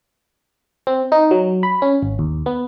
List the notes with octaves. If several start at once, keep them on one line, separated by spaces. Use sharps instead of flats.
C4
D#4
F#3
B5
C#4
G#1
D#2
B3